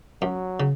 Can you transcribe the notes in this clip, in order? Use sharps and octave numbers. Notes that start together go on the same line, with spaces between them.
F#2 F#3
C#3